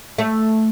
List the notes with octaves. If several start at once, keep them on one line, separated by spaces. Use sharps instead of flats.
A3